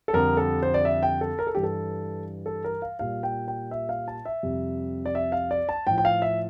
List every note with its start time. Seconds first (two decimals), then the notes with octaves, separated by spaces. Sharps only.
0.08 A4
0.14 F2 D3 G3 A#4
0.37 A4
0.63 C5
0.74 D5
0.85 E5
1.03 G5
1.21 A4
1.39 A#4
1.47 A4
1.55 G2 E3 G3 G4
1.63 A4
2.46 A4
2.64 A#4
2.82 F5
2.99 A#2 G3 F5
3.23 G5
3.48 G5
3.71 E5
3.89 F5
4.08 A5
4.25 E5
4.43 F2 C3 G3
5.06 D5
5.15 E5
5.32 F5
5.51 D5
5.69 A5
5.87 A2 F3 G5
5.98 G5
6.05 F5
6.22 E5